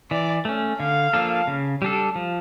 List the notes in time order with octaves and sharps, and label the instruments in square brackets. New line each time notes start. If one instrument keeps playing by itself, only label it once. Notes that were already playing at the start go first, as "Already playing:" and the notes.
[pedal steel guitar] E3 [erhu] D5
[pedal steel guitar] A3 C#4
[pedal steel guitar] D3 [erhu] F5
[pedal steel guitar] F3 A#3 D4 A4
C#3
G3 D4 A4
F3